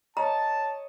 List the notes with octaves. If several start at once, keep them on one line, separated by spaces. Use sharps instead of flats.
C#5 D#5 A5 A#5